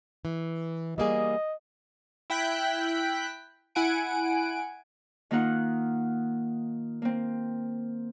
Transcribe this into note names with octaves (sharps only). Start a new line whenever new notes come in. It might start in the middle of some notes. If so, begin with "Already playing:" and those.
E3
G3 A#3 G#4 D#5
E4 G5 F#6 B6
E4 F#5 G#5 D7
D#3 A#3 D#4 F4 F#5
A#3 C4